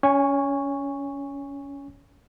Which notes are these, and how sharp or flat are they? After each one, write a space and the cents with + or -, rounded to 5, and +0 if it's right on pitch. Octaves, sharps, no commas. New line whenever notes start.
C#4 +20 G#5 -20 C#6 +0